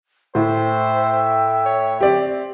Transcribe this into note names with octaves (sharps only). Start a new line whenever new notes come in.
A2 C5 E5 G5
C#5
C4 G4 D5